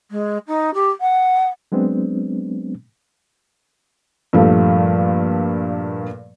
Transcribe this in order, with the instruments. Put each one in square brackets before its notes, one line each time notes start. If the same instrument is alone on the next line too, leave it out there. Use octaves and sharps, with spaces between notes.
[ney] G#3
D#4
G4
F#5
[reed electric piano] F#3 G#3 B3 C4 D4
[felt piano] G2 A#2 F3 A3